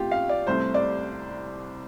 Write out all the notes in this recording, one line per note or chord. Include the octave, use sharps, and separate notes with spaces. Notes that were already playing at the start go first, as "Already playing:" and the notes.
Already playing: A2 A3 C4 F4 G4
F5
D5
C2 C3 A3 C4 C5
D5